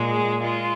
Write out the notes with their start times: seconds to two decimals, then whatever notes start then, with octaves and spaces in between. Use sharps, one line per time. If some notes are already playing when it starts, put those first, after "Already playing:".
Already playing: A#2 G#3
0.09 G#4
0.43 G#3 F4